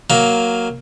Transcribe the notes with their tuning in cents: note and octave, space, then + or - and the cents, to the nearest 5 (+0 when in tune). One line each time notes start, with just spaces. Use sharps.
F#3 +0 A#3 +0 F5 +0